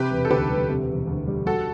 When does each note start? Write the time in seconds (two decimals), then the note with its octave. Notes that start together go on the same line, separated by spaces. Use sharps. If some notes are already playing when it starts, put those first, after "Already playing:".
Already playing: C3 G4 B4
0.10 E1
0.25 A4
0.30 D2 G4 B4
0.50 G3
0.69 C3
0.89 E1
1.07 D2
1.27 G3
1.46 G3 F#4 A4